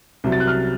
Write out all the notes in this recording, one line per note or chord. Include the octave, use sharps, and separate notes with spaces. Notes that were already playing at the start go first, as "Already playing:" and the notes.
C2 C3 F#3
A6
F#6
F6